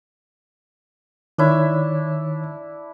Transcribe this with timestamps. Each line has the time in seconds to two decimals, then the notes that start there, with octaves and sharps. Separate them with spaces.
1.38 D#3 D4 E4 C#5